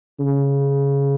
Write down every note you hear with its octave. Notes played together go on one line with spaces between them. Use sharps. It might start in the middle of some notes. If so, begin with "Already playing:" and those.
C#3